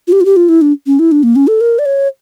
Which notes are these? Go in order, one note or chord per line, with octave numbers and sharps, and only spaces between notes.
F4
G4
F4
G4
F4
E4
D4
C#4
E4
D4
A#3
C#4
A4
A#4
D5
C#5